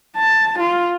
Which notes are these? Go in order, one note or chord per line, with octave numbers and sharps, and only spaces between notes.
A5
F4